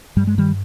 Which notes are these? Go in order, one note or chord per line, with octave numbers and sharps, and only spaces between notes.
G2 G3
G#3
D#3 G3